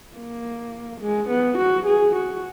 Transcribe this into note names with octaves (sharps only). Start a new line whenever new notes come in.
A#3
G#3
B3
F#4
G#4
F#4